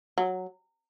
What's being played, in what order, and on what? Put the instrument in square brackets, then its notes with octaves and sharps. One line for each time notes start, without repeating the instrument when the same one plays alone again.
[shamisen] F#3